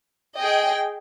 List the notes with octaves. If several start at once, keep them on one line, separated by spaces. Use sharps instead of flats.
G#4 D#5 G5